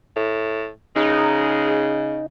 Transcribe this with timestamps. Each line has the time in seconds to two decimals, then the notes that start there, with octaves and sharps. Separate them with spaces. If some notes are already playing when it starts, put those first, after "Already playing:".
0.16 A2
0.96 C#3 G#3 D#4